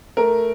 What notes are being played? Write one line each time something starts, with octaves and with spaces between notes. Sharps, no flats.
A3 A#4